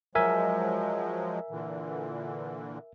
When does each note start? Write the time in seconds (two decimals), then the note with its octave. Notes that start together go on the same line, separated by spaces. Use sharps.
0.15 F3 F#3 G#3 A#4 E5 G#5
1.51 A#2 D3 E3